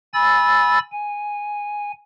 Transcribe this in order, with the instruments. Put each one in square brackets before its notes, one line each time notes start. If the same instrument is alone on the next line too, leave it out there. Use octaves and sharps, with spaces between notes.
[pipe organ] G#5 B5 E6 A6
G#5